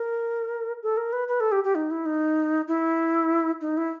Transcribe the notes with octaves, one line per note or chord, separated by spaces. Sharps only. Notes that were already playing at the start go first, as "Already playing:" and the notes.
Already playing: A#4
A4
A#4
B4
B4
A4
G4
G4
D#4
E4
D#4
E4
D#4
E4